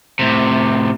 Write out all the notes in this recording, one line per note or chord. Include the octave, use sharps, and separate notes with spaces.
A2 C3